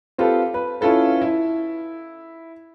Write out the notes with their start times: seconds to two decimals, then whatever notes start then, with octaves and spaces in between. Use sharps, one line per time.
0.18 C4 F4 G4 A4 B4
0.54 B4
0.81 C#4 E4 F4 A4 B4
1.22 E4